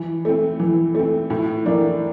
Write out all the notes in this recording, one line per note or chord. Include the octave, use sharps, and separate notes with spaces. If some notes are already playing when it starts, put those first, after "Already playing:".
Already playing: E3
A3 C4
E3
A3 C4
A2
E3 A#3 D4